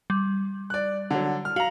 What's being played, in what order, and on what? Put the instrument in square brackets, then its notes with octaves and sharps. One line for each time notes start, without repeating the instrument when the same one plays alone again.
[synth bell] G3
[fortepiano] D5 F#6
D3 F#3
F6
[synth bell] F#4 [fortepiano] F5 A#5